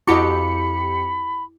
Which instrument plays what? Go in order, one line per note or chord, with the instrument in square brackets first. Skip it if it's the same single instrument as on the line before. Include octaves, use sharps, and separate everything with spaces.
[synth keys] F2 G4 C#7 [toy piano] E4 D6 [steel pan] F#4 D#5 [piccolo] B5